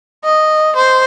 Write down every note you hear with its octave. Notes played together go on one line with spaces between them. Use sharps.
D#5
C5